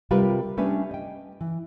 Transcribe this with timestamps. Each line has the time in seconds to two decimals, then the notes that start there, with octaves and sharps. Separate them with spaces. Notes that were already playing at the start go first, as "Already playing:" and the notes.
0.11 C3 G3 F4 G4 A#4 B4
0.57 G3 A3 C#4 D4 B4
0.91 D#5 G5
1.41 E3